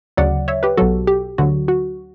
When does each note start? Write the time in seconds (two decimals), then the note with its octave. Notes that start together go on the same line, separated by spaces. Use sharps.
0.17 D2 C#3 F#3 D5 F#5
0.48 C#5 E5
0.63 G4 B4
0.77 B1 B2 F#3 F#4 A4
1.07 G4
1.38 D2 D3 F#3 F#4
1.68 F#4